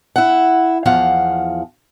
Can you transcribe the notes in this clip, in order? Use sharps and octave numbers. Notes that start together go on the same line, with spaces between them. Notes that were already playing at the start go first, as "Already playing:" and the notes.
E4 F#5
E2 F3 F5 F#5